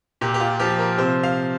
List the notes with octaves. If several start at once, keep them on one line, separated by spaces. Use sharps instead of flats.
A#2 G4
G4
F4
F3 G4
A#4
C3 C5
F5